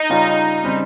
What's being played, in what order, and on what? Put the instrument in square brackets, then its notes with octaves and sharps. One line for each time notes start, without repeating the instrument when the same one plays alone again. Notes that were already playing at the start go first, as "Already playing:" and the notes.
Already playing: [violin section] D#4
[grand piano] C#3 G3 C#4 F4
C#3 G3 C4